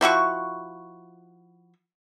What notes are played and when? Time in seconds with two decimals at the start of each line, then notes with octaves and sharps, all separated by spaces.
0.01 F3 E4 F#4 C#6